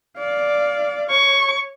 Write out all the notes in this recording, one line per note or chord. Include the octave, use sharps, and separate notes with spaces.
D5 F5
C#5 C#6